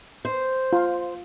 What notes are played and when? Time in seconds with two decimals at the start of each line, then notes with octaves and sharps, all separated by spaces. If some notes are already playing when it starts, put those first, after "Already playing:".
0.25 C5
0.73 F4